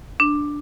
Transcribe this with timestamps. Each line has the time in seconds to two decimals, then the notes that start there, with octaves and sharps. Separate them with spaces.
0.20 D4